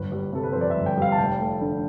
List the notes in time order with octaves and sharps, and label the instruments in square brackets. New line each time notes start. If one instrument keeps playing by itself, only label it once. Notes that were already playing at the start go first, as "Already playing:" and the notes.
Already playing: [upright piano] G1 B4
G3
C3 A4
B4
F2 C5
D5
E5
G1
G5
G3 F5
A5
F1 G5
A3
D3